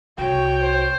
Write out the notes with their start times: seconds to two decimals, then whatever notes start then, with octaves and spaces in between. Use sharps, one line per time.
0.18 C2 F#4 C#5 G5
0.63 C5